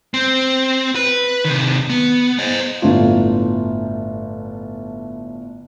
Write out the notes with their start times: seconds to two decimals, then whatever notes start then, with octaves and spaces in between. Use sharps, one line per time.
0.14 C4
0.95 B4
1.45 C3 D#3
1.90 B3
2.39 C5 D#5
2.82 G1 A2 D4 F4